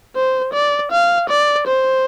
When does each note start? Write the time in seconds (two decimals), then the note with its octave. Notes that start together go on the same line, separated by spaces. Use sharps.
0.16 C5
0.53 D5
0.92 F5
1.30 D5
1.67 C5